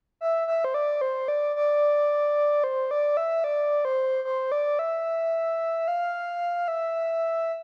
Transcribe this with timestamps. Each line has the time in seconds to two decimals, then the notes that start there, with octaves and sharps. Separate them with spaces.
0.21 E5
0.47 E5
0.64 C5
0.74 D5
1.01 C5
1.28 D5
1.56 D5
2.64 C5
2.91 D5
3.17 E5
3.44 D5
3.85 C5
4.25 C5
4.52 D5
4.79 E5
5.88 F5
6.68 E5